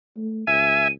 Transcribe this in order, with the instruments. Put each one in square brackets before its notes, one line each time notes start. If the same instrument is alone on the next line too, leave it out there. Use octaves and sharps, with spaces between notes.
[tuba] A3
[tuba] C#2 [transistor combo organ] E5 G#5 [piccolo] D#7